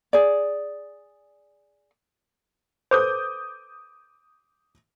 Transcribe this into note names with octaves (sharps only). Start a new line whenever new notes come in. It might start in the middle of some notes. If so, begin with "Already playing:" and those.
G#4 D5
A4 B4 C5 D6 D#6 G6